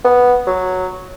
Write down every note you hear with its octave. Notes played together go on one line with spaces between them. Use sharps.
B3
F#3